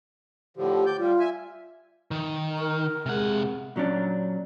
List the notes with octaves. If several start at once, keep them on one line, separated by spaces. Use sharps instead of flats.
A2 D3 F3 G4
D5 G6
G3 F4
E5 G#5
D#3
A#4
C3 G#3 G#4 F#5
A#2 F#3 C#4 D4